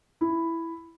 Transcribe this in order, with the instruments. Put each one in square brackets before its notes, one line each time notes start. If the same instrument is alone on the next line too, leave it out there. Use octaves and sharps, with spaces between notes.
[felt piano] E4